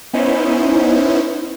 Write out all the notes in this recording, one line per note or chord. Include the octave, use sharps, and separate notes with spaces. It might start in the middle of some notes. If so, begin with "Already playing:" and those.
B3 C#4 D#4 E4 C5